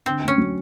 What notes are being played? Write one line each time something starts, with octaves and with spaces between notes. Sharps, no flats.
D3 C4
D2
C#4
F#3